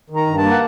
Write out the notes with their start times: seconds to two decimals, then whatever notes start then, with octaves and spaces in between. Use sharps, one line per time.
0.10 D#3
0.16 A#5
0.27 G2
0.38 A5
0.43 A#3
0.51 F#5